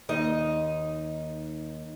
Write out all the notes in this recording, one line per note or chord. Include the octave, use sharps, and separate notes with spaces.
D#2 D#4 D#5